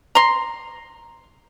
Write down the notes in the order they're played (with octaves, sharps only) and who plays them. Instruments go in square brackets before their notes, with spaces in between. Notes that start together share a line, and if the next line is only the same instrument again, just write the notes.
[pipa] A#5 C6